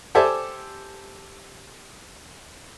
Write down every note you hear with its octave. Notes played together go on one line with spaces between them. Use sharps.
G4 A4 C5 D5 E5 G#5